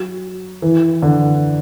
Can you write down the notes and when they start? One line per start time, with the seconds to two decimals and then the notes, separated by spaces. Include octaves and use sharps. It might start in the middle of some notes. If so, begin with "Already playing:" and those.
Already playing: F#3
0.62 E3
1.02 D3